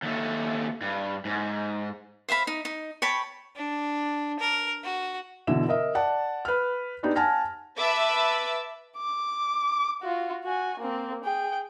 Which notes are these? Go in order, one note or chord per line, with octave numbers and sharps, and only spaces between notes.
D#2 A3
G2
G#2
C5 E5 F5 B5
D#4
D#4
C#5 G5 A5 B5
D4
A#4
F#4
B2 D3 E3 E5 E7
A#4 D#5 E5
D5 F#5 A5
B4 F6
B3 D4 D#4 G4
F#5 G#5 A5 F6 A#6
B4 E5 A5 B5 D6 E6
D6
F4 F#4
F#4 G#5
A#3 C4
G#4 G5